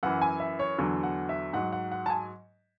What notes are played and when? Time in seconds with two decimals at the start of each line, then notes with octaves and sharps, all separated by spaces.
0.03 F#2 E3 F#5
0.22 G#5
0.40 E5
0.59 C#5
0.78 E2 D3 F#3
1.03 F#5
1.29 E5
1.53 G#2 F#3 F#5
1.72 F#5
1.91 F#5
2.06 A5
2.10 G#5